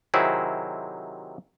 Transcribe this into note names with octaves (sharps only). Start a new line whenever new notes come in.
C3 D#3 F#3 C4 E4 G#4